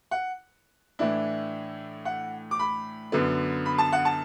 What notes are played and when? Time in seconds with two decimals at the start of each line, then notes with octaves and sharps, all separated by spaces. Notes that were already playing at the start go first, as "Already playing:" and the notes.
0.11 F#5
0.99 A2 E3 D4 E4
2.05 F#5
2.51 D6
2.59 B5
3.12 F#2 D3 B3
3.66 B5
3.78 A5
3.93 F#5
4.05 A5